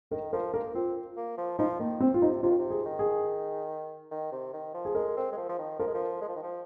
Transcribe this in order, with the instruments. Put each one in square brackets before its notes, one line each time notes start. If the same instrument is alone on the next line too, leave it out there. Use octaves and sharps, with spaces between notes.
[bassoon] D#3 [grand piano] A#4
[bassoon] F3 [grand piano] A#4
[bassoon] A#3 [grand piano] A#4
[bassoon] C4 [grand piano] F4
[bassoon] A#3
F3
[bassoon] F3 [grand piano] D#4
[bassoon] D#3 [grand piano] A#3
[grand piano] C4
F4
[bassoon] C3 [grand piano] D#4
[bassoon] C3 [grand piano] F4
[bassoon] D#3
C3
[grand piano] G#4
[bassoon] D#3
[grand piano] G#4
[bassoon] D#3
C3
D#3
F3
[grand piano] G#4
[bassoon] G#3 [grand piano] A#4
[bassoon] C4
G#3
F3
F3
D#3
[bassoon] F3 [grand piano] A#4
[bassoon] G#3
F3
G#3
F3
D#3
F3